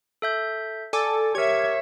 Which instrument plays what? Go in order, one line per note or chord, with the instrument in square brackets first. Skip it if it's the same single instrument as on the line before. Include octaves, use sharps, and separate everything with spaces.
[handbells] A4 E5 G6
[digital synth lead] A4 [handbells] D5 G#5 D6
[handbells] G4 A#4 [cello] C#5 E5 [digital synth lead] G#6